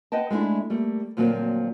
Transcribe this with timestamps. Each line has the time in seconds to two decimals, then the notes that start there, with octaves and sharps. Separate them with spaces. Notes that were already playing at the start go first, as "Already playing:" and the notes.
0.12 B4 D#5 F#5 G5 A5
0.30 G#3 A3 C#4 D4 E4
0.70 G3 A3 A#3
1.17 D2 A#2 F3 F#3 A#3 C4